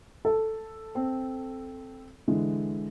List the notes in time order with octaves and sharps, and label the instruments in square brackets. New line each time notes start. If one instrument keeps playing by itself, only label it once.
[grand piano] A4
[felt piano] C4
D3 E3 G#3